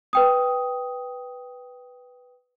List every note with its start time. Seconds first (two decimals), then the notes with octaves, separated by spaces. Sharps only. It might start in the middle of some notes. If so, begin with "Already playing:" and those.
0.13 B4 G5 D#6